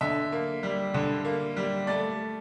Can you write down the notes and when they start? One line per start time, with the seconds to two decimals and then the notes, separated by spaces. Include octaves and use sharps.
0.01 D3 E5
0.32 A#3
0.63 G3
0.94 D3
1.25 A#3
1.56 G3
1.87 A3 D5